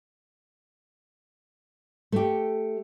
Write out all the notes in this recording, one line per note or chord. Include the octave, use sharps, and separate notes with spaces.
A3 G4